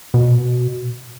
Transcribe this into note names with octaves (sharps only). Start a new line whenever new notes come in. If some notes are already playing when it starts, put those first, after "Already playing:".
B2